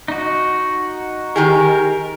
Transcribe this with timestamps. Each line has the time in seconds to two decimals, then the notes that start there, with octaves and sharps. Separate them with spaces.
0.08 D#4 F#4
1.36 D#3 G4 G#4 A#4